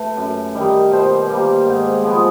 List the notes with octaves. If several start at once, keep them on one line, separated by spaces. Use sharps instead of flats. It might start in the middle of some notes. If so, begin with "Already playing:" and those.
Already playing: A3 B4
F#2
D#3 G3
B2 C5
G3 A#3
G#2
F3 G#3 B3